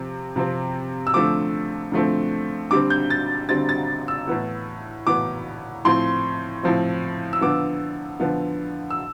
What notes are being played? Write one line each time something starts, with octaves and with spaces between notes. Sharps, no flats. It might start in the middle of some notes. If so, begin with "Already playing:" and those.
Already playing: C3 F3 C4
C3 F3 C4
E6
D3 F3 A3 C4 D6
D3 F3 A3 C4
D3 G3 C4 D6
G6
A6
D3 G3 C4 A6
A6
E6
A2 E3 B3
A2 E3 B3 D6
A2 F3 C4 C6
A2 F3 C4
E6
D3 F3 B3 D6
D3 F3 B3
E6